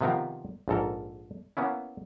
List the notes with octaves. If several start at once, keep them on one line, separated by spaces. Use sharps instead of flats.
C3 D#3 F3 B3 C4 A#4
A#1 G#2 A4 A#4
A#3 B3 C#4 E4